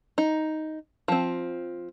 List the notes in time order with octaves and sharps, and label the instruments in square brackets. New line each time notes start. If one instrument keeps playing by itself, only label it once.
[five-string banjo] D#4
F3 C4